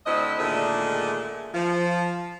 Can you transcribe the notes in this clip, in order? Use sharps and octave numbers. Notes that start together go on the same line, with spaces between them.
D2 D3 C4 E4 D#5
A#2 D3 D#3 G#3 A3 G#4
F3